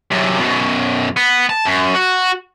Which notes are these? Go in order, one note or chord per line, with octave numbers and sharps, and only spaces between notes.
F#2 C3
F#2 B2
B3
A5
F#2
F#4